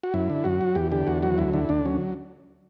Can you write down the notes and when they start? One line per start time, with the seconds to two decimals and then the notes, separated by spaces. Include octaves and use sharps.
0.03 F#4
0.14 F#2 E4
0.30 D3
0.44 F#2 F#4
0.61 F#3
0.75 E2 G4
0.92 D3 G4
1.07 E2 F#4
1.23 F#3 F#4
1.38 D2 E4
1.53 D3 E4
1.69 D2 D4
1.85 F#3 C#4